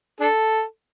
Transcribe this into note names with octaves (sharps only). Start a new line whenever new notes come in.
D4 A4